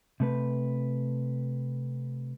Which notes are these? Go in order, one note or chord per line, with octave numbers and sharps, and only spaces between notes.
C3 A3 B4